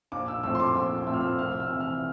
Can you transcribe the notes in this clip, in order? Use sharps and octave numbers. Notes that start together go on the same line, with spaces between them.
A#1 D6
E6
A2 F3 C4 E6
C6
D6
A#1 E6
A2 F3 C4 E6
F6
E6
C2 F6
E6
C3 E3
F6